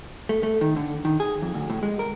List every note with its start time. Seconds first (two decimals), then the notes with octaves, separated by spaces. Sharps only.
0.29 A3
0.43 A3
0.61 D#3
0.76 D3
1.05 D#3
1.20 G#4
1.42 F2
1.54 D2
1.70 A2
1.83 G#3
1.99 A#4